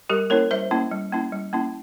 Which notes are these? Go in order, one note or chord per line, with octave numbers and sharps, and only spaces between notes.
G3 G4 A#4
A#3 C#4 E4 A#4 C#5
G3 C5 E5
A#3 C#4 E4
G3
A#3 C#4 E4
G3
A#3 C#4 E4